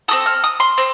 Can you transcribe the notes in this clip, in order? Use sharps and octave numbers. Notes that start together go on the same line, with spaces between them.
C4 F#4 A4 D#6
F6
D#6
C6
C4